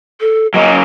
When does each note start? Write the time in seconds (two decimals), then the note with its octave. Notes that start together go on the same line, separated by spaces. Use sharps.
0.21 A4
0.54 F#3 A#3 C#4 D#5